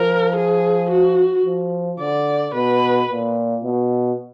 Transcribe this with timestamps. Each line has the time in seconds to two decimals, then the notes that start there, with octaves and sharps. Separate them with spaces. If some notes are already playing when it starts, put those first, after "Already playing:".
Already playing: F3 A#4
0.37 G#4
0.90 F#4
1.45 F3
2.00 D3 D5
2.54 B2 B4
3.09 A#2
3.64 B2